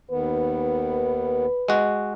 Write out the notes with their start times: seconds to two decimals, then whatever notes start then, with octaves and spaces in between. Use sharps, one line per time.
0.11 D#2 D#3 B3 B4
1.68 G#3 F#4